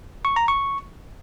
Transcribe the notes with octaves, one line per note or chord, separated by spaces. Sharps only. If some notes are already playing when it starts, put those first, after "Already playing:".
C#6
A#5
C#6